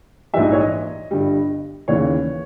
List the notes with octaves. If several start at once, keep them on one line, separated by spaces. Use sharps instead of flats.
A#1 G#2 E3 G3 E5
D#5
C#5
D#5
G1 G2 G3
D#2 C#3 E3 C#5